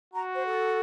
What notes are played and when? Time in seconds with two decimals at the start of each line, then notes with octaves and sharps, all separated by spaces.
0.14 F#4 A#5
0.35 C5
0.46 A4